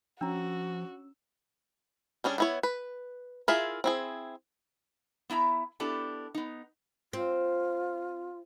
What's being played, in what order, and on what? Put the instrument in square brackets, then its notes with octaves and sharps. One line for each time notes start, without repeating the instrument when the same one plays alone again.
[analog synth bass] F3 [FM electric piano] C#4 E6 [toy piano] D4 A#5 [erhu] F#4
[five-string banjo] G3 C#4 D4 G#4
B3 E4 C#5
B4
E4 F4 G#4 A#4 E5
C4 E4 G#4
[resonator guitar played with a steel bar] B3 E4 E5 A#5
B3 D4 E4 G4 A4
B3 D#4
[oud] C4 [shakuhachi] F4